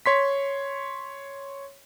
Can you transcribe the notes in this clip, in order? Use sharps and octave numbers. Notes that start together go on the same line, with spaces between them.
C#5 C6 B6